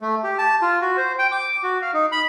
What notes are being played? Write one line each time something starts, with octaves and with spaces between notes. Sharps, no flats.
A3
G4
A5
F4
F#4
C5
G5
D6
F#4
F5
D#4
B5